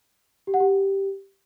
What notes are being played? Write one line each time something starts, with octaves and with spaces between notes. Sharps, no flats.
G4
F#5
G4